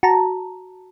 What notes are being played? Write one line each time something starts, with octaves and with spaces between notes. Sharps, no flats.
F#4 A5 A#5